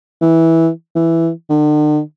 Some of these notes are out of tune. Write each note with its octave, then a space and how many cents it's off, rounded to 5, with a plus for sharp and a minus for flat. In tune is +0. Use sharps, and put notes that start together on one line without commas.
E3 -10
E3 +5
D3 +45